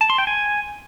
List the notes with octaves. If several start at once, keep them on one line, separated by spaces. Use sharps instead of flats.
A5
C6
G5
G#5